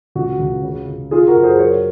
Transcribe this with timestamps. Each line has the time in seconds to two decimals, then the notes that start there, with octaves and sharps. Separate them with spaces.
0.15 C#2 F#4
0.40 C#2
0.63 C#3
0.88 C#3
1.11 C#3 F4 G#4
1.28 F#4 A#4
1.35 F#2
1.43 G#4 C5
1.59 F#3 A#4 C#5